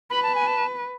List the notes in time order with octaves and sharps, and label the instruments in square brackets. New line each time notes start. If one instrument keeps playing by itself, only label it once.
[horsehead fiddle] B4 [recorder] B5
[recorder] A5
G#5
A5